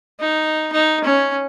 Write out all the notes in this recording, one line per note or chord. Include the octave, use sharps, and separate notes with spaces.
D#4
D#4
C#4